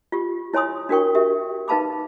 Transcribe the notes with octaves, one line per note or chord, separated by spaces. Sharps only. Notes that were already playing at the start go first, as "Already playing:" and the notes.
F4 G4
E4 C#5 G#5 C6 D#6
D4 F#4 A#4 G5 C#6
G4 A#4 E5
D#4 B4 F5 A5 B5 D6